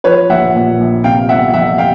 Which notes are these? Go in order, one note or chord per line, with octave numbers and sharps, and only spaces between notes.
F3 B4 C#5
A#1 E5 F#5
A#2
A#1
C3 F5 G5
G1 E5 F#5
F2 E5 F#5
F5 G5